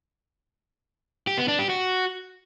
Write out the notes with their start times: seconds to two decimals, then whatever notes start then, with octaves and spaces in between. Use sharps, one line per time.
1.27 G4
1.38 B3
1.48 D4
1.59 G4
1.69 F#4